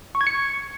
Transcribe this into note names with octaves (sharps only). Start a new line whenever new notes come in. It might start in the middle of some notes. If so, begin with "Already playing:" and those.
C#6
G#6
C#7